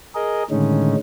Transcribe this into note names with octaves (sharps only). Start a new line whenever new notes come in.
G#4 A#4 D#5
A2 D3 D#3 G#3 C#4 D#4